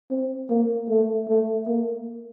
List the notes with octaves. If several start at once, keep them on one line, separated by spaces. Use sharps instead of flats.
C4
A#3
A3
A3
A#3